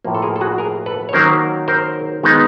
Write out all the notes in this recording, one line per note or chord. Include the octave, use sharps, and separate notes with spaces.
A2 F3 A#3
A4
G#4 A#4
A4
F#4 G#4
G#4 A#4
A4 B4
C#5
D#3 F#3 A#3 C#4 A#4 C5
A#4 C5
D#3 G#3 B3 D#4